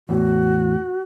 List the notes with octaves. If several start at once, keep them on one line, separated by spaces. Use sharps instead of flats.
E2 A2 F#4